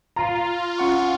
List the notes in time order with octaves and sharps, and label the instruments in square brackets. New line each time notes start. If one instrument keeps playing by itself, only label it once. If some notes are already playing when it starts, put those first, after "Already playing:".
[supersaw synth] F4 [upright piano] A#5
[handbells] C#4 F#5 C#6